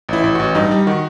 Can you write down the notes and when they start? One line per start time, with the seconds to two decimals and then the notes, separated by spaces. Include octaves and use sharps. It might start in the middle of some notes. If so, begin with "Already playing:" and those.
0.09 A1 E4
0.24 A1
0.35 A1 F#4
0.55 G2 D#4
0.71 G3
0.87 D#3 F#4